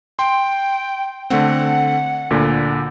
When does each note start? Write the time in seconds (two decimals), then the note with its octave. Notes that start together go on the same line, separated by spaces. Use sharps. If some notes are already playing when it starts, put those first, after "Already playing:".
0.19 G5 C6
1.30 D3 A3 C4 F#5
2.30 D2 A#2 D3